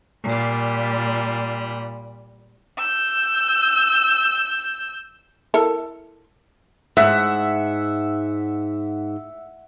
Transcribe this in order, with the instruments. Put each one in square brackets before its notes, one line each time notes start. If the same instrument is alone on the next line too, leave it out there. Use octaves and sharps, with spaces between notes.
[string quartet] A#2 G3
[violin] E6 G6
[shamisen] E4 A4 A#4
[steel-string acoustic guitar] G#2 [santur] E5 F#5